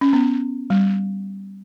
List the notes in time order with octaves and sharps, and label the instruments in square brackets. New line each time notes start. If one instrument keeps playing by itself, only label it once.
[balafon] C#4
B3
G3